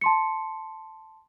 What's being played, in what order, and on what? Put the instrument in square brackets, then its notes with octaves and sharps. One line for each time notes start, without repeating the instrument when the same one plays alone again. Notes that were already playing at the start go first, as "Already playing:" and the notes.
[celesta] A5 C6 C#7